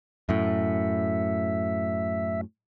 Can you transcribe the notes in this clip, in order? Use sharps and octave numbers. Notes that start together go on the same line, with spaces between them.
F#2 A2 E5